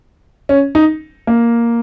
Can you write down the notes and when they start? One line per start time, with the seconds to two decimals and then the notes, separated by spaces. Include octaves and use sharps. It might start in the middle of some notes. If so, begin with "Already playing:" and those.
0.49 C#4
0.75 D#4
1.27 A#3